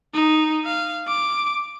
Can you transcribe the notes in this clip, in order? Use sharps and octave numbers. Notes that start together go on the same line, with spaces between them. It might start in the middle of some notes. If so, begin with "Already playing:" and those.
D#4
F5
D6